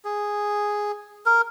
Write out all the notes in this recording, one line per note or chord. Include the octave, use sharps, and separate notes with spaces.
G#4
A#4